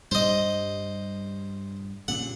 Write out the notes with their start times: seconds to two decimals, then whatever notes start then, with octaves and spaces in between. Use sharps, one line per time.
0.11 G2 G3 C5 D#5
2.08 G2 A#2 C#3 F#5